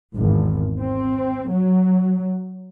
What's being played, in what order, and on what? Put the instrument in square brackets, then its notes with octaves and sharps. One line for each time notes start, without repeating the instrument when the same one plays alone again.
[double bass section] G#1 E2
C4
F#3